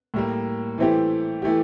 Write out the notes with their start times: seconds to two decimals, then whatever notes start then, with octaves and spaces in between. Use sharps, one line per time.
0.14 A2 G3 A#3
0.78 E3 A3 C4 E4 G4
1.42 E3 A3 E4 G4